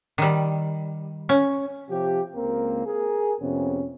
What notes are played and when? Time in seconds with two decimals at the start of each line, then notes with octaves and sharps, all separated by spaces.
0.18 D#3 G3
1.29 C#4
1.90 C3 F3 G4
2.35 C#2 A#3 C4 A#4
2.86 G#4 A#4
3.41 F2 C3 B3 C#4